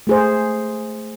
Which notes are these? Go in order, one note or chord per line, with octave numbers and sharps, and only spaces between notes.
A3 G#4 C5